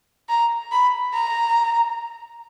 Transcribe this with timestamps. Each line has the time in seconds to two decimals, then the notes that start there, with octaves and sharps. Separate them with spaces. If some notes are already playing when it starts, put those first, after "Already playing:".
0.29 A#5
0.72 B5
1.14 A#5